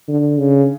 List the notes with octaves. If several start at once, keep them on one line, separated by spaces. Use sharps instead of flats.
D3
C#3